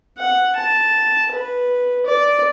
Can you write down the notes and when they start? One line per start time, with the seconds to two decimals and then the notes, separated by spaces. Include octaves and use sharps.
0.18 F#5
0.56 A5
1.31 B4
2.06 D5